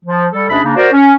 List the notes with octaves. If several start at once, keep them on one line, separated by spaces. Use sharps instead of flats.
F3
G3 A4
D2 B2 C#4 D4 G#4 B5
C#3 A#3 D4 D#4
F#4 A#4 C5 D5
C#4